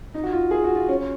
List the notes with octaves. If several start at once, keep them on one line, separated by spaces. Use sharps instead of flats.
D#4
F#4
F4
G#4
F#4
F4
C#4